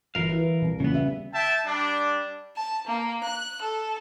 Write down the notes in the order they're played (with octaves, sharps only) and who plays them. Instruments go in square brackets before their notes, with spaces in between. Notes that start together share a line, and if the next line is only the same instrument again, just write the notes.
[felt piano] G1 [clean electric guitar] E3 A#4 F5
[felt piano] E4 B4
C2
[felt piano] A#1 E2 [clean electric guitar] C#3 B3
[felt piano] G3 E5
[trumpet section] E5 G5 A5
G3 D4
[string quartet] A5
A#3
F#6
A4